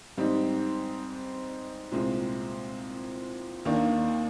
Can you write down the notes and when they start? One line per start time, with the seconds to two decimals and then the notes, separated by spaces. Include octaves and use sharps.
0.18 G#2 G3 C4 D#4
1.92 C2 A#2 G#3 C4
3.65 D#2 D#3 A#3 D4